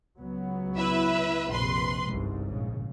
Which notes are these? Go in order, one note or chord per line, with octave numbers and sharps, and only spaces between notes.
C#2 F#3 B3
E4 B4 E5
A#1 F2 C3 B4 C6
G1 C2 G#2
A#1 C#3